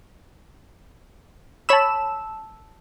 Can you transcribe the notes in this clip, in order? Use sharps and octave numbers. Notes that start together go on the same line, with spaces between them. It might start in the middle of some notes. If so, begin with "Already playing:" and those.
C#5 A5 B5 E6 E7